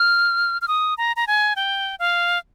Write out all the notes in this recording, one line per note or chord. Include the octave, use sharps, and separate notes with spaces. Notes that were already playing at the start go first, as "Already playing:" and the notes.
Already playing: F6
F6
D#6
A#5
A#5
G#5
G5
F5